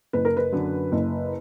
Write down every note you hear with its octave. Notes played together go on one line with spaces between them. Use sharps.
F#1 B4
A#4
B4
F#2 D3
F#1